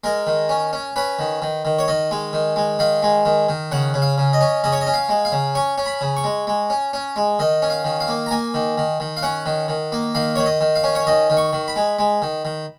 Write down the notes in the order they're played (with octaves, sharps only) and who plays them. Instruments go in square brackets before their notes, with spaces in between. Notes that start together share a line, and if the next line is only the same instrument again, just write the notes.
[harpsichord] G#3 A#4
D#3
C#4
C#4
C#4 B4
D#3
D#3
D#3
C#5
D#3 D#5
G#3
D#3
G#3
D#3 F5
G#3
D#3
D#3
C#3 F#5
C#3
F5
C#3
D#5
C#4
C#3 D#5
C#5
D#5
C#4
F5
G#3
F5
C#3
C#4 C#6
C#4
B5
C#3
C#6
G#3
G#3
C#4
C#4
G#3
D#3 D#5
C#4
F5
D#3
F5
A#3
A#5
A#3 G#5
D#3
D#3
D#3
F5
C#4 F#5
D#3
D#3
A#3
D#3 F5
D#3 C#5
D#5
D#3
F5
C#4
C#5
D#3 D#5
D#3
C#6
D#3
B5
G#3
G#3
D#3
D#3